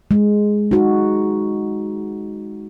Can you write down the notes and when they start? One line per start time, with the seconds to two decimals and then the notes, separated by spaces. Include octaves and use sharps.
0.11 G#3
0.71 D#4 F#4